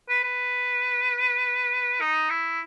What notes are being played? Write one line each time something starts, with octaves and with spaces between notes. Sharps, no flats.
B4
B4
D#4
E4